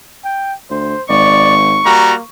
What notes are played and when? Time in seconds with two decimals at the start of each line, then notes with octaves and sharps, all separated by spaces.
0.24 G5
0.70 D2 C5
1.09 G#1 D5 C#6
1.86 G3 A#3 F#4 A#5